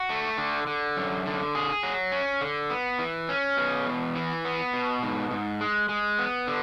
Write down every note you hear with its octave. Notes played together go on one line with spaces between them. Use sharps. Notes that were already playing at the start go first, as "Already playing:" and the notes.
Already playing: F#4
A3
D3
D3
F#2
D3
G#4
F#3
C#4
D3
B3
E3
C#4
B2
E2
E3
B3
B2
G#2
G#2
G#3
G#3
B3
D3